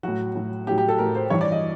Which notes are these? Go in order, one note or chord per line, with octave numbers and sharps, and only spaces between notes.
A2 F#3 F#4
A2 F#3
A2 F#3 G4
G4
A4
A2 F#3 A#4
C5
G2 E3 C#5
D5
D#5